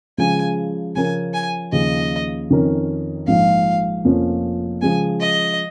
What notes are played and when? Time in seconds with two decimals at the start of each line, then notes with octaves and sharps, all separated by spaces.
0.18 C#3 F3 G#3 G#5
0.95 C#3 F3 C#4 A#4 G#5
1.34 G#5
1.72 D#2 C#3 F3 C#4 D#5
2.50 F2 D#3 C#4 A#4
3.27 A#1 G#2 F3 F5
4.04 F1 F2 F3 A#3 C#4
4.82 C#3 F3 G#3 G#5
5.20 D#5